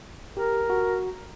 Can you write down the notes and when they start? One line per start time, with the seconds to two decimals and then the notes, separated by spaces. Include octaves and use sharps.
0.37 G4 A#4
0.70 F#4